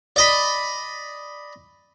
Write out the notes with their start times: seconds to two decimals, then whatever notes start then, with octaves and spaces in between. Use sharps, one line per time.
0.16 D5 D#5 B5